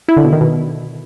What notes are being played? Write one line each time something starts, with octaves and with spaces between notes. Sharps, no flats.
E4
D3
B2
D#3
B2